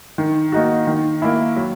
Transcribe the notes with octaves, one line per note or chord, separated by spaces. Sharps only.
D#3
A#3 D#4 F#4
D#3
A#3 E4
F#3